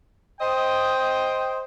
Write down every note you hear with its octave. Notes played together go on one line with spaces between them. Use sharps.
C5 D#5 G5